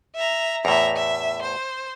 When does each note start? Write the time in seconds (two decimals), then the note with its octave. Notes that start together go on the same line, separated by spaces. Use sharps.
0.15 E5 A#5
0.65 E2 A2 E5 A#5
0.96 E5
1.42 C5